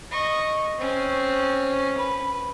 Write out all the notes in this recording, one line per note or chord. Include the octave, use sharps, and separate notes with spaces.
D#5 C#6
C4 C#4
B4